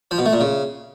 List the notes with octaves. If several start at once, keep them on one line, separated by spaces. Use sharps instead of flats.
F3
B2
A3
A#2
C#3